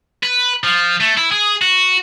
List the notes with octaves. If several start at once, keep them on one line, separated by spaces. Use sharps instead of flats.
B4
F3
A3
E4
G#4
F#4